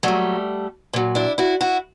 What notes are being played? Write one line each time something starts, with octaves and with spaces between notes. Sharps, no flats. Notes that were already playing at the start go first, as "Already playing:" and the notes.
A#2 F#3 G3 A3
A#2 F#3
D4 E4
E4 F#4
E4 F#4